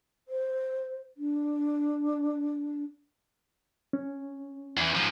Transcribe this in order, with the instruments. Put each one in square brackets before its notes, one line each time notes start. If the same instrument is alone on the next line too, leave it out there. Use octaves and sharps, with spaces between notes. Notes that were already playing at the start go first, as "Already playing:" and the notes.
[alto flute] C5
D4
[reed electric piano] C#4
[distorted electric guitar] E2 E3
G#2 F3